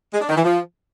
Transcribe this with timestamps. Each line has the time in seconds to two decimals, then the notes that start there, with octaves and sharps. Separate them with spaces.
0.13 G#3
0.21 D4
0.29 D#3
0.36 E3
0.44 F3